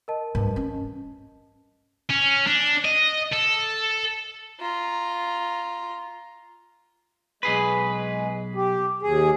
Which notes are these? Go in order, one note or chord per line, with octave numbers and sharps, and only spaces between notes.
A#4 D#5 A5
G2
C#4
C#4
D4
D#5
A4
F4 A#5
B1 G#3 G#4 B4
G4
D#2 G#4